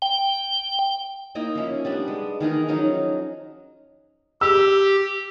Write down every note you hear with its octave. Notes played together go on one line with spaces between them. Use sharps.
G5
A#3 D#4 E4 D#5
F3 C#4 E5
G3 B3 D4
G#3
D#3 E3 G#4 A#4
F3 F#3 C#4 D#4
G4 E6